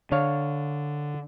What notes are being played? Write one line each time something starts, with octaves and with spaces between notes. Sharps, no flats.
D3 D4 C#5 F5